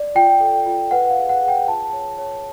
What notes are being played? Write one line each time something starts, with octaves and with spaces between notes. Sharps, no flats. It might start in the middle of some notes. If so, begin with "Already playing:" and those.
Already playing: D5
F4 G5
A4
F4
B4 F#5
F5
G#4
F#5
G#4
G5
F4 A5
C#5
C#5